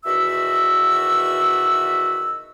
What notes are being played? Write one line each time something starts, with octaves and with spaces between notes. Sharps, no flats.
E2 B2 D#3 F#4 E5 E6